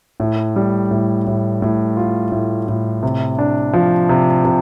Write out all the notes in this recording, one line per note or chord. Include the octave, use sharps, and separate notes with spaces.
A2
G3
A2
A2
A2
F4
A2
A2
C3
D4
F3
C3
C3